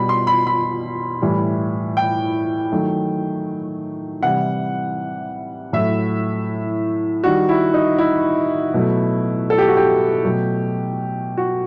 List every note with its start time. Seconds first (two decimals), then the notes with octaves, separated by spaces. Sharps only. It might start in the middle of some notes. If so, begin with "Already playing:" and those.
Already playing: B2 G3 B5
0.09 C6
0.27 B5
0.47 B5
1.21 A2 E3 G3
1.97 G5
2.72 D#3 F#3 A3
4.23 C3 E3 G3 F#5
5.73 A2 F#3 A3 E5
7.24 D#3 G3 F#4
7.49 E4
7.74 D#4
7.98 E4
8.74 B2 F#3 A3
9.50 A4
9.58 G4
9.68 F#4
9.77 G4
10.25 B2 F#3 A3
11.37 F#4